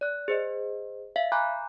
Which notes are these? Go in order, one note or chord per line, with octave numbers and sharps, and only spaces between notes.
D5 F#6
G#4 C5 D#5
E5 F5 B6
G#5 A#5 B5 D6 F#6 G6